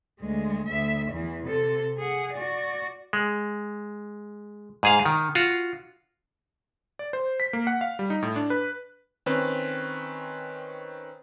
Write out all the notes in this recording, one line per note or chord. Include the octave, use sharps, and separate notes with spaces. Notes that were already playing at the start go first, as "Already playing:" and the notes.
D2 G#3
D2 E5
E2 E3
C3 A4
G#4 F#5
F#4 D5
G#3
G#2 G#4 F5
D#3
F4 F#4
D5
C5
B6
A#3
F#5
F5
G3
D#4
A2
D4
B4
D#3 C4 C#4 B4